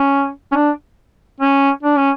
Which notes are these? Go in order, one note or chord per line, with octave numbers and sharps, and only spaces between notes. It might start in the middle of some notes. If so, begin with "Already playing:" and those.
Already playing: C#4
C#4
D4
C#4
D4
C#4